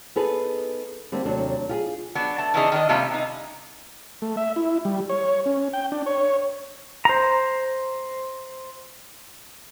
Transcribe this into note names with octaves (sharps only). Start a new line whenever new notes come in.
B3 D#4 G#4 A4 B4
D3 G3 A#3 C4 D4
D#2 C3 F#3 A3 D4
F4 G4 G#4
F#3 B3 D4
A3 A5
C#3 E3 B3 D4 D#4 G#4
D#3 D4 D#5
C3 G3 A3 B3 C#4 F4
C3 D#4
A3
E5
E4
G3
C#5
C#4
G5
D4
C#5
C5 A#5